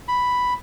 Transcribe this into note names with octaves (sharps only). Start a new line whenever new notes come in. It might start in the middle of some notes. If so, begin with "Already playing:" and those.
B5